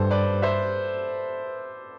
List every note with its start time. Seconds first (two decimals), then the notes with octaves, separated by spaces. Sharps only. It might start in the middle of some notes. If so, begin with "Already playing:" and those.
Already playing: G2 A4 C5
0.11 B4 D5
0.42 C5 E5